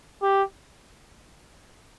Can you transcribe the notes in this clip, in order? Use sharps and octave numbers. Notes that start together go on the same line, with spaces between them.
G4